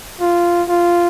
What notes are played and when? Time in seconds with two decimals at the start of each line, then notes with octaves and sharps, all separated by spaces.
0.20 F4
0.68 F4